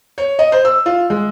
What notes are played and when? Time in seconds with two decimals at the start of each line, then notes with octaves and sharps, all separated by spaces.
0.18 C#5
0.39 D#5
0.52 C5
0.65 E6
0.86 F4
1.10 G#3